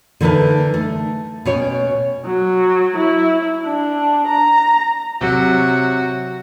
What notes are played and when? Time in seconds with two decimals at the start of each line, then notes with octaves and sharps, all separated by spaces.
0.20 D3 E3 D#4 A#4 B4 A5
0.74 A3
1.45 B2 C#4 C#5 G5
2.25 F#3
2.97 E4
3.65 D4
4.27 A#5
5.21 C3 F#3 F#4